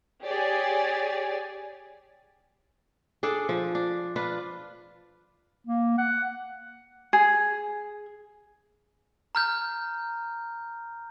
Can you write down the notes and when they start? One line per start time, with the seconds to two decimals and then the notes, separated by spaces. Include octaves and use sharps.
0.23 G4 G#4 C#5 D5 G#5
3.23 D4 G#4 A4 D5
3.49 F3
3.75 D4
4.16 D4 F4 B4
5.67 A#3
5.98 F#5
7.13 G#4
9.35 A#5 F6 G6